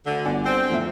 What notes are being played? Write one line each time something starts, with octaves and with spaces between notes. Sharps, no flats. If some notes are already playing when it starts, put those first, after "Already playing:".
D2 D3
G1 D5 F#5 G#5
C4
E2 A2 F3 E5